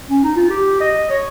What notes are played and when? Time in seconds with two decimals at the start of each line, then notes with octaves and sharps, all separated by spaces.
0.10 C#4
0.23 D#4
0.36 F4
0.50 G4
0.80 D#5
1.10 C#5